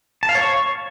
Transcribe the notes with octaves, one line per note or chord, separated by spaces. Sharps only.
A5
F5
C#5
C#6